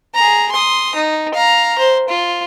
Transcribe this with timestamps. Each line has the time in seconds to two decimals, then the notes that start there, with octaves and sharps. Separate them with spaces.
0.15 G#4 A#5
0.52 C6 D#6
0.95 D#4
1.34 F5 A#5
1.79 C5
2.09 F4